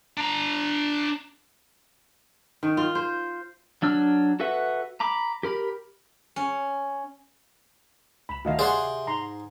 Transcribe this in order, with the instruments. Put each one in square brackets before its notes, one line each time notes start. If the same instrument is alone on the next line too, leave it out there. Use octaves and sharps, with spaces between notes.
[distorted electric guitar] D4 A#5
[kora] D#3
F4
C5
[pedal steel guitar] F#3 D4 E6 F6
F#4 A4 B4 E5 F#5
A#5 B5 D6
G4 A#4 B5
[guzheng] C#4
[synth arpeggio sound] C#2 E7 [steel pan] B5
[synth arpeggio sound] D2 A2 D#3 [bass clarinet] A3 [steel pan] F#4 D#5 F5
[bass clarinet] C3 [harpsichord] G#4 C5 [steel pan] D5 F#5 C6
[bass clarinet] G#2 [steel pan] A#5 C6